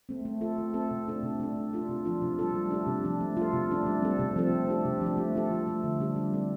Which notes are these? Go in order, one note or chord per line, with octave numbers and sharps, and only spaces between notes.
A3 C4
A3
F4 A4
A3
C4 A4
C3
A3 D4 A4
C3
A3 D4
A3
D4 F4 A4
C3
F3 D4 F4
C3
G3 F4 A4
A3
D4 G4
C3
F3 D4
A3
F4 A4
C3
A3 D4
G3
C4 A4
C3
F3 C4 A4
A3
D4 G4
C3
F3 D4 G4
A3
F4 A4
F3
A3 F4
D3
G3 D4 G4
G3
C4 A4